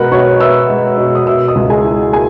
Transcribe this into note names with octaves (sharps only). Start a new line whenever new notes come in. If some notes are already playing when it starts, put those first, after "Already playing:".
Already playing: B2 G#3 A#4 F#5 A#5 B5 F#6
B2 C#5 C#6
B3 E5 E6
G#3
B2
D#6
B2 E5 E6
D#5 D#6
C#2
G#4 G#5
E4
A#3 G#4 G#5